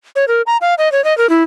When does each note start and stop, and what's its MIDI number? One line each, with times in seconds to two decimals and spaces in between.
0.16 0.25 73
0.28 0.42 70
0.47 0.57 82
0.61 0.74 77
0.78 0.91 75
0.92 1.04 73
1.04 1.16 75
1.18 1.29 70
1.29 1.43 64